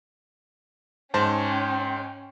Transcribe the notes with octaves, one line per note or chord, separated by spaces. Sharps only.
G#2 C#4 C5 G5 A5